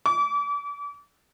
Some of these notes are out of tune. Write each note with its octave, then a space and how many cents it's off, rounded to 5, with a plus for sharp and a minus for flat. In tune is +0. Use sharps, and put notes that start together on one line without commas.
D6 -35